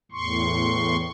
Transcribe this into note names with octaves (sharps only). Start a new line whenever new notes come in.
E2 A2 C6 C#6